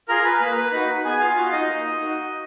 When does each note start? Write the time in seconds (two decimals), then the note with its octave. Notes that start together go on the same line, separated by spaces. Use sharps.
0.09 F4 G#4 A#4 A#5
0.25 B4 B5
0.40 A#3 B4 B5
0.57 B4 B5
0.72 D#4 F#4 B4 B5
1.05 B3 G#4 G#5
1.20 F4 F5
1.36 F4 F#4 F5
1.52 D#4 D#5
1.68 A#3
2.00 D#4 F#4